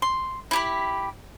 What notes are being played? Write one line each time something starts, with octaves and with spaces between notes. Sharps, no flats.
C6
E4 G4 B5